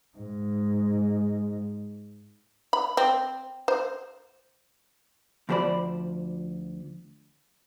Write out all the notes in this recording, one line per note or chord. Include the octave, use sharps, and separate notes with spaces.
G#2 G#3
B5
C4
C5
D2 F3 G4 C5 D5 B5